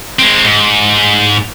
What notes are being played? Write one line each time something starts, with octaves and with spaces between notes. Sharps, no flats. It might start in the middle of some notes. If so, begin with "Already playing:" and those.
G#3 C4
G#2